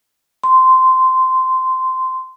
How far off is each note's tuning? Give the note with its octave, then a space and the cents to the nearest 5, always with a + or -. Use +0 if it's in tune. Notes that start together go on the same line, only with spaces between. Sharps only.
C6 -15